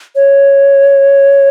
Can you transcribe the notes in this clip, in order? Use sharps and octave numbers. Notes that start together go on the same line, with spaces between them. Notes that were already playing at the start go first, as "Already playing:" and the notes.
C#5